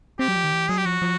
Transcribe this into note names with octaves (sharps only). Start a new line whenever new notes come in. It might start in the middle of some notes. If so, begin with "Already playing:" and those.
C4 G4
F#3
F3
D#3
E3
F#3 G#4
G4
F3 F#4
F3